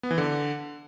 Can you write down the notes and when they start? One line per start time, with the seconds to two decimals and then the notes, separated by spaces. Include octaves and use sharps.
0.03 B3
0.11 E3
0.18 D3